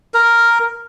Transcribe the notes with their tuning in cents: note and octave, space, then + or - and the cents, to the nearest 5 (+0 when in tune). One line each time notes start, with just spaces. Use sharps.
A#4 +0